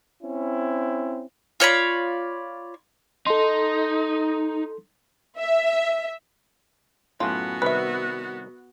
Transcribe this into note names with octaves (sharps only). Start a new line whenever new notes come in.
C4 C#4 E4
F4 C#5 D5 B5
D#4 A4 C6
E5
F#2 A2 B3 F4 F#4
C2 D#3 B4 E5